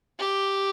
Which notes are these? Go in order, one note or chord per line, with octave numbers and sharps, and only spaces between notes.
G4